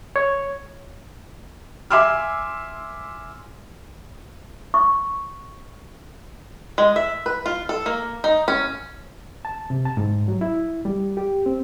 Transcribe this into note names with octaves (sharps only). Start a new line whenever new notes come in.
C#5
E5 G#5 C6 D6 E6 F6
C#6
G#3
E5
B4
F4
A4
A#3
D#4
C#4
A5
C3
A5
G#2
F#3
E4
G3
G4
C4